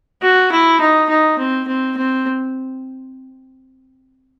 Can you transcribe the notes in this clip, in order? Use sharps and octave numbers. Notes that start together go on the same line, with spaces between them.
F#4
E4
D#4
D#4
C4
C4
C4